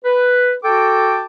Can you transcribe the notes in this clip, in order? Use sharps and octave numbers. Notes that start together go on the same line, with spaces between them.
B4
F#4 A4 G5 A5 D6